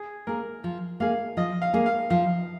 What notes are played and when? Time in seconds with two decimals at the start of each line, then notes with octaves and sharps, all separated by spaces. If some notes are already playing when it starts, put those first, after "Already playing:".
Already playing: G#4
0.27 A#3 G#4 A#4
0.64 F3
1.00 A#3 G#4 F5
1.37 F3 D#5
1.62 F5
1.74 A#3 G#4
1.86 F5
2.10 F3 F5